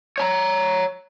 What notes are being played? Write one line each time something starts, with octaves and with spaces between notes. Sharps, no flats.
C#5 A5 A#5